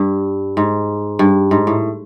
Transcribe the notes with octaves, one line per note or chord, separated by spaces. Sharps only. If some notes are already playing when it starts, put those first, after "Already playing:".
Already playing: G2
G#2
G2
G#2
A2